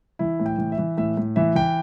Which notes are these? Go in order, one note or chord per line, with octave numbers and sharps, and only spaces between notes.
E3 E4
A2
G5
E3
E5
E3
A2 E5
A2
E3 E5
E3 G5